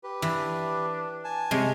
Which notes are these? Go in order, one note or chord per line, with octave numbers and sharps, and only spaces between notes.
G4 B4
E3 D4
G#5 A5
C3 G#3 C#4